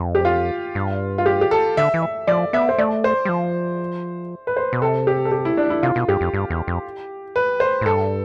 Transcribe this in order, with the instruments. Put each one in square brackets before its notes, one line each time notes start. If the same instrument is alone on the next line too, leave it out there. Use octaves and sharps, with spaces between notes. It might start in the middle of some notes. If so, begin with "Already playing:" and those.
Already playing: [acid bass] F2
[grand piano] G4
F4
[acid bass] G2
[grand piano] F4
G4
G4
A4
[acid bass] D3 [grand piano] E5
[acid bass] E3
[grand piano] E5
[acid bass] F3 [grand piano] D5
[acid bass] B3 [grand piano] E5
[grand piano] C5
[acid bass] A3 [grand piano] D5
[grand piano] C5
[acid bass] G3
F3
[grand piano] B4
C5
[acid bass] B2
[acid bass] C3 [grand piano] A4
[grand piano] G4
A4
G4
E4
D4
E4
[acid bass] C3 [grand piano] F4
[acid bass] B2
[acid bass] G2 [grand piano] G4
[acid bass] F2
G2
E2
F2
[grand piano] B4
C5
[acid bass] A2
[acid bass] G2 [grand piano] A4